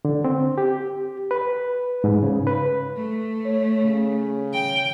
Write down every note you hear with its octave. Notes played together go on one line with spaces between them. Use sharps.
D3
C4
G4
B4
G#2
C#3
B4
A3
C#5
C#3
G5